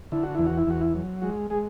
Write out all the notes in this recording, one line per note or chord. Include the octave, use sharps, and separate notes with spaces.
D3 E4
F#4
E2 E4
F#4
E4
E2 F#4
E4
F#3
G#3 F#4
G#3 G#4